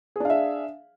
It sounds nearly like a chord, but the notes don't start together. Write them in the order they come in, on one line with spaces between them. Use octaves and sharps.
G#4 D4 F5 E5